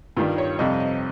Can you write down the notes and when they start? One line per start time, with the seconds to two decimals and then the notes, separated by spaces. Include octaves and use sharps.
0.17 G2 D#3 G3 F4
0.38 C#5
0.59 F2 C3 G3 D#5
0.80 D#5